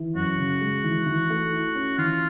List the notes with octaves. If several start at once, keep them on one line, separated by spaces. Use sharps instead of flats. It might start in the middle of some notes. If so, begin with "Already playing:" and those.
Already playing: E3
F#2 F#4
C#3
G#3
E3
E3
A3
E4
C#4
E3 F4